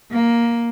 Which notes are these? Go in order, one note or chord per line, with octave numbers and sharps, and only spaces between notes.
A#3